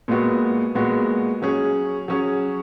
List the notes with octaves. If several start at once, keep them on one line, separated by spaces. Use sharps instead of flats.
A#2 G#3 B3 F#4
A#2 G#3 B3 F#4
F#3 C#4 G#4
F#3 C#4 G#4